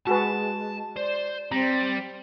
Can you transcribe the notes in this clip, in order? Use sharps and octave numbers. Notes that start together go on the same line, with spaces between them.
G#3 F#4 G#4 B4 A5
C5 D5
G3 C4 A#5